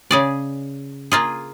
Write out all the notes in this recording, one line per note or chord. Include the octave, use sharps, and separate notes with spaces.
C#3 G#4 D5
A#3 F4 G#4